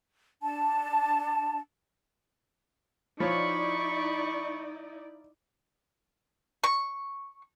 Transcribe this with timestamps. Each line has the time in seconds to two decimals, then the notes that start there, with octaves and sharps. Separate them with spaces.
0.42 D4 A5
3.20 F3 D#4 E4 C#5 D5 B5 C#6
6.64 C#6